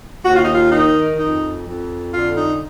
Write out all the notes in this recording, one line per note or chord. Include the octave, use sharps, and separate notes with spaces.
D#2 F#4
F4
D#4
F4
D#3 D#4
F2 D#4
F2
D3 F4
D#4